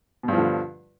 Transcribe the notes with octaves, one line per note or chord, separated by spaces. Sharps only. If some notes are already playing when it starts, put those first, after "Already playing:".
G2 B2 D3 F3